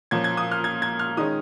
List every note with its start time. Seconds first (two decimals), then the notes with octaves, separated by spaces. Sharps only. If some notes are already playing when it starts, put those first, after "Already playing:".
0.11 A#2 F3 C#4 G#6
0.24 G#6
0.37 D#6
0.52 F6
0.64 G#6
0.82 G#6
0.99 F6
1.17 D#3 G#3 C#4 D#6